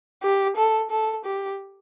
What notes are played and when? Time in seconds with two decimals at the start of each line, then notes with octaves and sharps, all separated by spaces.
0.23 G4
0.57 A4
0.90 A4
1.25 G4